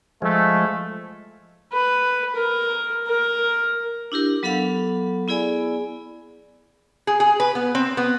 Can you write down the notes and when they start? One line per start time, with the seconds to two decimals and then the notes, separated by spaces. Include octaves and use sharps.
0.22 F3 G#3 A3
1.73 B4
2.36 A#4
3.07 A#4
4.12 D4 E4 G4 A#4
4.43 F#3 B3 A4 F5 F#5 B5
5.28 B3 E4 G#4 D5 G#5 B5
7.07 G#4
7.20 G#4
7.40 B4
7.55 B3
7.75 C4
7.97 B3